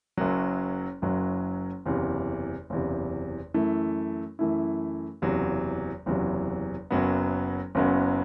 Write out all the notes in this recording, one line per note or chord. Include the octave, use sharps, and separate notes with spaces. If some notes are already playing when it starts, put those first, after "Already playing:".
F#1 F#2 F#3
F#1 F#2 F#3
F#1 E2 C3
F#1 E2 C3
F#2 E3 A3 E4
F#2 E3 A3 E4
F#1 E2 C3 F#3
F#1 E2 C3 F#3
F#1 F#2 F#3 B3
F#1 F#2 F#3 B3